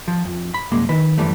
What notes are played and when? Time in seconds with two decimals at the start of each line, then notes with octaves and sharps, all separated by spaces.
0.08 F3
0.25 F2
0.54 B5
0.71 C2 F#2 G#3 A#3
0.89 D#3 B4
1.18 F#2 E3 G3 A3